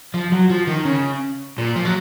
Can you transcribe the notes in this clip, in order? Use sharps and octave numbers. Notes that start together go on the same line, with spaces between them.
F3
F#3
F3
D#3
C#3
A#2
F3
F#3